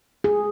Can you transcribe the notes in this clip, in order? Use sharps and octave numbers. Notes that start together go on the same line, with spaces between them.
G#4